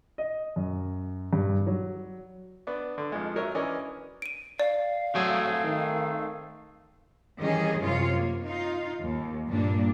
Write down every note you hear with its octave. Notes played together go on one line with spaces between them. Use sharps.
D#5
F#2
G2
F#3
B3 D4
D3
F2 F3 G#3
F#3 A#4 C#5 D#5 E5
E3 C#4 D4 A#4 D5 D#5
D7 D#7
D5 F5
F#3 A3 C4 G#4
D#3
D#3 E3 G3 C#4 G#4 D#5
F#2 C3 F4 C#5 F5
A#3
D#4 F4 F5
D#2
G2 A#2 G3 A#3 D4